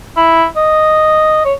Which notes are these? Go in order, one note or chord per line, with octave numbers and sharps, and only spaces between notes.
E4
D#5
C#5